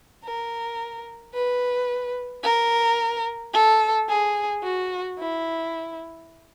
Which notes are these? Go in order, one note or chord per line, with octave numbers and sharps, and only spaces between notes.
A#4
B4
A#4
A4
G#4
F#4
E4